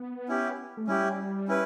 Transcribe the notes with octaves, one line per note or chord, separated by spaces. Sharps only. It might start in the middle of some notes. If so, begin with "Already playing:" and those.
Already playing: B3
C#4 E4 G4
A3
G3 C#4 E4 G4
C#4 E4 B4